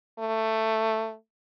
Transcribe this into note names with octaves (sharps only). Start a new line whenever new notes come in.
A3